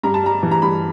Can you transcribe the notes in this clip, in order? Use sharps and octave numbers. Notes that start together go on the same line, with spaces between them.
G2 A#5
A5
G3 A#5
E3
A#5
G2 B5